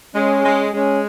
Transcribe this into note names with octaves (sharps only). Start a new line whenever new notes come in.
G#3 C#4
G#3
G#3 C#4